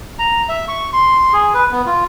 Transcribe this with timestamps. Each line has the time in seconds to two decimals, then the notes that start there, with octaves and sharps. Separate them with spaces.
0.19 A#5
0.49 E5
0.68 C#6
0.93 C6
1.33 G#4
1.54 B4
1.71 B3
1.86 F4